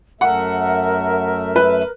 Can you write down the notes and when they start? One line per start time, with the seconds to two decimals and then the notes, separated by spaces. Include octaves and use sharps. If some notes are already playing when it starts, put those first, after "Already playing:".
0.21 F#2 A3 A#4 E5 F#5
1.56 B4